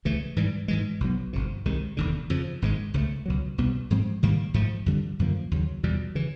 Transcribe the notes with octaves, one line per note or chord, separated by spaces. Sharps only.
C#2 C#3 E3 A3
G#2 E3 G3
G#2 E3 G#3
B1 B2 F#3 B3
G1 F2 C3
C2 C3 D#3 G#3
E1 D#2 D3
F2 C#3 F3
G#1 G#2 D#3 G#3
C#2 C#3 E3 A3
C#2 B2 F#3
C2 B2 G3 B3
G#2 F3 G#3 C4
G#2 D#3 G3 A#3
G#2 F3 A3
F2 D3 G3
F#2 D3 F3 A#3
D#2 C#3 F#3
E2 B2 G3
C#3 E3